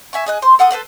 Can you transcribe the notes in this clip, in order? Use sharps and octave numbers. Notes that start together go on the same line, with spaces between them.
E5 G#5 C#6
G#4 D#5 F#6
C5 C6
A4 F#5 C6 D#6
A4 B4 C5 F#5